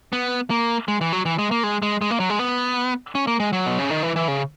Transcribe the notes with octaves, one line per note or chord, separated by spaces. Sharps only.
B3
A#3
G#3
E3
F#3
E3
G#3
A#3
G#3
G#3
G#3
A#3
F#3
G#3
B3
C#4
A#3
G#3
F#3
B2
C#3
D#3
E3
E3
C#3